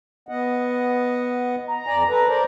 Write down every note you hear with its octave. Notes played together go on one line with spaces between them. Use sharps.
B3 D#5 F#5
A#5
F2 D5 G#5
A4 B4
A#4 C5 D5